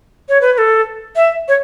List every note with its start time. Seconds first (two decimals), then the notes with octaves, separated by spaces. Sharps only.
0.29 C#5
0.41 B4
0.53 B4
0.58 A4
1.16 E5
1.48 C#5